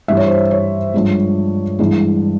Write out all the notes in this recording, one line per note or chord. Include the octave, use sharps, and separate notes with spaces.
G2 E3 G3 E5
C#5
C5
C#5
C#5
G2 F3 G#3
G2 E3 G#3